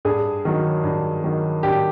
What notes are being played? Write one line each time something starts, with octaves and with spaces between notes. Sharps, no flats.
G2 G#4
D#3 F#3
G2
D#3 F#3
G2 G4